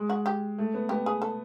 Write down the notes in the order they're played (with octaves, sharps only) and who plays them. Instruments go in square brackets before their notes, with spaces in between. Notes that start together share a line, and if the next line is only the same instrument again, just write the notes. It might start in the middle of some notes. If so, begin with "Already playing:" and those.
Already playing: [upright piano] G#3
[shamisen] F#4
G4
[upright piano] A3
B3
[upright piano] B3 [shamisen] G4
[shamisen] G#4
A4